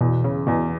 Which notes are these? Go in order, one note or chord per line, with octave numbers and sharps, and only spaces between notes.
E2 B2
C#3
E2 B2